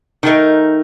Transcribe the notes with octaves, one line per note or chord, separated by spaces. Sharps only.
D#3 A3 D#4 A#4